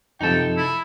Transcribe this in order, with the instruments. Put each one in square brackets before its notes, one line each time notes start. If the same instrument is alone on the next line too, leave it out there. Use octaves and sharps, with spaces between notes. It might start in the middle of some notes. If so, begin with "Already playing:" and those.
[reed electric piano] F#2 C3 F3 [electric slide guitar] D#4 A4 [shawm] G5
[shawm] E4